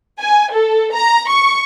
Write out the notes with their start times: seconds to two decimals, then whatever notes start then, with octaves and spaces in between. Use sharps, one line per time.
0.20 G#5
0.53 A4
0.94 A#5
1.29 C#6